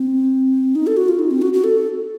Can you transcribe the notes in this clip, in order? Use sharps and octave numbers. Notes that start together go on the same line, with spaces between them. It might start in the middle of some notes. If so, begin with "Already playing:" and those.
Already playing: C4
D#4
A4
F#4
F4
D#4
C4
F#4
F#4
A4